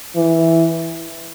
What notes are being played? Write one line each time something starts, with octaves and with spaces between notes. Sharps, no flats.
E3